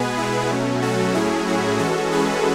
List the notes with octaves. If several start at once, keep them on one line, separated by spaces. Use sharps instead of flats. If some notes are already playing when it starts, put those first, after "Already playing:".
Already playing: B2 G#3 B3 G#4 B4
E4
B2 F#3 A3 C#4
F#4 A4
A2 F#3 A3 C#4 E4 G#4
F#4
E3 G#3 C#4 F#4 A4
G#4 B4